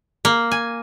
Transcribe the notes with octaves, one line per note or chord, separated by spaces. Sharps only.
A#3
G#5